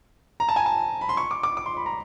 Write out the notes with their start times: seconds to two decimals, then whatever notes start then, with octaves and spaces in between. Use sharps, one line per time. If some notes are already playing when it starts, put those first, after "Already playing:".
0.40 A#5
0.49 A5
0.56 G#5
0.66 A5
1.01 B5
1.09 C6
1.17 C#6
1.31 D6
1.43 D6
1.57 D6
1.66 C6
1.77 B5
1.86 A#5